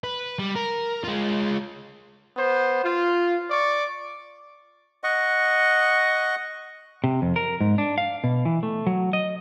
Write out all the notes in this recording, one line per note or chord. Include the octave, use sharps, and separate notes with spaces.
B4
G3
A#4
G#3 F4
B3 C5
F4
D5 C#6
D#5 F#5 C#6
C3
F2
A#4
G#2
D4
F5
B2
E3
A3
F#3
D#5